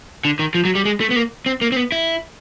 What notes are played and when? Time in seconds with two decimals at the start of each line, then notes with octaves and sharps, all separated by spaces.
0.25 D3
0.39 D#3
0.55 F3
0.65 F#3
0.75 G3
0.85 G#3
1.01 A3
1.11 B3
1.16 A#3
1.46 C4
1.61 A#3
1.72 C4
1.76 B3
1.92 E4